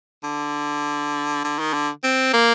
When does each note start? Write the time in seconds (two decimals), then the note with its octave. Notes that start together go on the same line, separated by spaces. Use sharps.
0.24 D3
1.44 D3
1.59 D#3
1.73 D3
2.04 C4
2.34 A#3